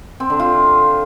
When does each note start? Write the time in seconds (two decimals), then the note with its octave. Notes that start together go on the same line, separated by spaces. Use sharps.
0.20 C4
0.30 D3
0.40 F4